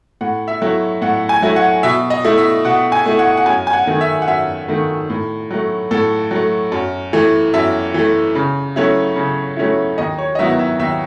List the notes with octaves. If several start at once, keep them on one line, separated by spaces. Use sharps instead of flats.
A2 F#5
E5
F#3 A3 E4
A2 F#5
G#5
F#3 A3 E4
F#5
B2 E5
D#5
A3 E4
E5
B2 F#5
G#5
A3 E4
F#5
F#5
F#2 G#5
G#5
F#5
D#3 A3
E5
F#5
F#2 E5
D#3 A3
A2
F#3 A3
A2 A4
F#3 A3
F#2
E3 A3
F#2 E5
E3 A3
C#3
F#3 A3 C#4 E4
C#3
F#3 A3 C#4 E4
D#2 D#5
C#5
D#5
D#3 F#3 B3 E4 E5
E5
D#2 E5